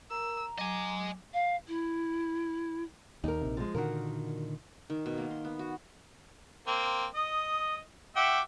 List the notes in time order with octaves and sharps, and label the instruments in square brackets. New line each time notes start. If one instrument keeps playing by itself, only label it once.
[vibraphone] A#4 [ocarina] A#5 [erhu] E6
[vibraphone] F#3 [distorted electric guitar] D#5 G#5 [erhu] D6
[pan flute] F5
E4
[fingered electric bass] D#2 [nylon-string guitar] D#4 A#4
[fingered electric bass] A#1 C3
[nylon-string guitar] F3 G#3
[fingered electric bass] A#2 D3 D#3 [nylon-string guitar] F#4 A#4
[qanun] D#3
B2
A#3
C6
B3
F#4
[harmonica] A#3 C4
[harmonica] D#5 [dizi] D#6
[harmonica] F#4 E5 G5 [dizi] D6